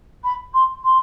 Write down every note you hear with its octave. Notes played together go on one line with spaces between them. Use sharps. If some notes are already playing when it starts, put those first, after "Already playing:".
B5
C6
C6